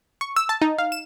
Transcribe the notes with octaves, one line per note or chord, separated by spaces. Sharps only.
C#6
E6
A5
D#4
F5
E7